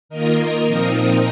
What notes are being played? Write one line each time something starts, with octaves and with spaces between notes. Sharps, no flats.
D#3 A#3 F4 A#4 D#5
A#2 F3 C4 D#4